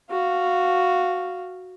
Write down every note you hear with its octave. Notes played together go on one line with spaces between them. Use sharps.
F#4 F5